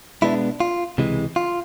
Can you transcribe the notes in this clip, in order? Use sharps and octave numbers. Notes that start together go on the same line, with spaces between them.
B2 G#3 B3 D4 E4
F4
C#2 C3 E3 G#3
F4